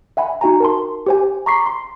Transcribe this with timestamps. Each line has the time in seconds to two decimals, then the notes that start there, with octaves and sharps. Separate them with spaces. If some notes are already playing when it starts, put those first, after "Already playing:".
0.17 E5 F#5 G#5 B5
0.41 D#4 F#4 G#5 A#5
0.60 A#4 A5 C6
1.06 G4 C5 G#5
1.46 A#5 B5 C#6 D6 B6 C7
1.66 C6